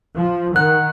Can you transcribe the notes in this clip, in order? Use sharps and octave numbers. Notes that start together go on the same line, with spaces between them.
F3
D#3 F#5 F#6